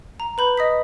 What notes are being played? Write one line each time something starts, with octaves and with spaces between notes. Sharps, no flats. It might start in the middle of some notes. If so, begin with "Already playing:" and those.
A#5
B4 B5 G6
D#5 D#6 B6